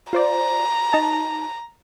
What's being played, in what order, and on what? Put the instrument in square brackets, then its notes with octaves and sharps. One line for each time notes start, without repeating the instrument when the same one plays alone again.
[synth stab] F4 C5 D5 [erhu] A#5
[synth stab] D#4 A5